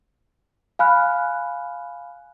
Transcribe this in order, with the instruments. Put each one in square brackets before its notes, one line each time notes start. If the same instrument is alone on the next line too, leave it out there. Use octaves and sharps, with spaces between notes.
[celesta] F5 G#5 B5 F6 F#6